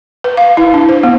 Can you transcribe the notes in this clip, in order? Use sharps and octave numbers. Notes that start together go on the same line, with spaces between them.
B4
F5
E4
D4
C5
B3